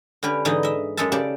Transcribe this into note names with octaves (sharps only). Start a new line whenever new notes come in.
D3 C#4 G4 B4
G#2 D3 E3 D#4 D#5
D#5 E5
F#2 G#3 A4 E5 A5
C#3 G4 D5 A5